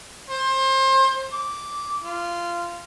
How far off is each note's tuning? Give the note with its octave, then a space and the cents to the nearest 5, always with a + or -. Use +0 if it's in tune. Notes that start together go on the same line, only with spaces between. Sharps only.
C5 +30
D6 -10
F4 -15